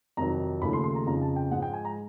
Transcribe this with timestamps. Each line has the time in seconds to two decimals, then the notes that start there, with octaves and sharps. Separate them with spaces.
0.17 F2 C3 D#3 F#3 A#5
0.62 D#2 C#3 F3 A3 B5
0.73 C6
0.84 C6
0.95 A#5
1.07 F2 C#3 F3 A#5
1.22 A5
1.36 G5
1.51 G#2 F3 G#3 F#5
1.62 G5
1.73 G#5
1.85 A#5